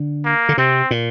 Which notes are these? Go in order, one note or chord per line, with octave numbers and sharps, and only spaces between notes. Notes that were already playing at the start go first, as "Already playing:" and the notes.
Already playing: D3
A#3
D3
C3 C4
A#2